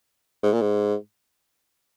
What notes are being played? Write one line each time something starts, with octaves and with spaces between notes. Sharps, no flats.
G#2
A#2
G#2